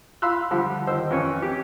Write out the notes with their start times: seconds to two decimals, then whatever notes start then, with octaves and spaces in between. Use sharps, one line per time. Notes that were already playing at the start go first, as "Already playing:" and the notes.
0.22 F5 B5 C6 E6 F#6
0.51 D3 F3 G3
0.87 D#3 C5 E6
1.10 F2 E3 C#4
1.42 G4